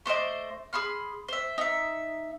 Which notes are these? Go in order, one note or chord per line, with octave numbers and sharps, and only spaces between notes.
A3 C5 D5 D#5
G#4 B5 C6 F6
C5 E5
D#4 E5